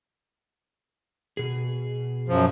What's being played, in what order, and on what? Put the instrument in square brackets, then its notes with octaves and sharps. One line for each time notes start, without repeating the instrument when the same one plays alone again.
[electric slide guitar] B2 G#4
[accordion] F#2 F3